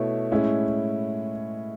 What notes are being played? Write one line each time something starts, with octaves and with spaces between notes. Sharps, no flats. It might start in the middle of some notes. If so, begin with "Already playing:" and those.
Already playing: B2 A3 E4 C#5
A2 G#3 C#4 E4